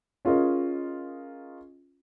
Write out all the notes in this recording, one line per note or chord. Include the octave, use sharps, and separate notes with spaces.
C#4 F4 G#4 A#4 D#5